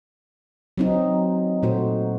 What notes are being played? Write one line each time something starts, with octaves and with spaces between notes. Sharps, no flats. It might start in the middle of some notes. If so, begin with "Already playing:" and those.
F#3 C4 D#4
A#2 A3 D#4 F#4 C5